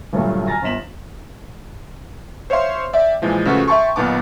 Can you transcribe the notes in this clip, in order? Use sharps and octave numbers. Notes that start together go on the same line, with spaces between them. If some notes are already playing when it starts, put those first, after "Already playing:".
D2 G2 A#2 F#3 A3 A#3
G#5 A#5 F6 A6 A#6
G1 B3 B6 E7 F#7
C5 C#5 E5 F5 C6
D5 E5 G5
A#2 E3 F3 G#3
C#3 F3 A3 F#4 A4 B4
E5 G5 A5 C6 C#6
B1 A#2 D#3 B3 A5 D6